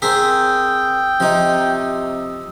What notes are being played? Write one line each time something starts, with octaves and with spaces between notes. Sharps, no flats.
C4 G#4 A#4 G5 D#6 E6 B6
C3 F3 D#4